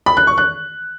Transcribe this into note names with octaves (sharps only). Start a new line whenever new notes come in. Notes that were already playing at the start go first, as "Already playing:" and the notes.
B5
F#6
C#6
F#6